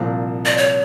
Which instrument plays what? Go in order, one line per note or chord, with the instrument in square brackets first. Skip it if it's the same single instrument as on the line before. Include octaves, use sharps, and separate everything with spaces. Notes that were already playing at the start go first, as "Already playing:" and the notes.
Already playing: [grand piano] C2 A#2 F3
[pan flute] D5
C#5